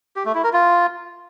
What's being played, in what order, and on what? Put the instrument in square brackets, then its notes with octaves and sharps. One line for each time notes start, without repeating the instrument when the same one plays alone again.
[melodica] G4
A3
E4
A#4
F4